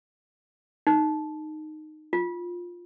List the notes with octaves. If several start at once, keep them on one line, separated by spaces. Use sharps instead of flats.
D#4
F4